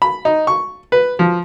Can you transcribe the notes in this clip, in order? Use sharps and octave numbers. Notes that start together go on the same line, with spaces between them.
B5
D#4
C#6
B4
F3